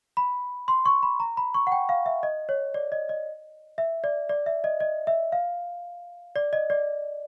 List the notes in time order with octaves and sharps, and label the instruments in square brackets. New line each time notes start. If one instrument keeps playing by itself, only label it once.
[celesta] B5
C6
C#6
B5
A#5
B5
C#6
F#5
G5
F5
E5
D#5
C#5
D5
D#5
D#5
E5
D5
D5
E5
D#5
D#5
E5
F5
D5
D#5
D5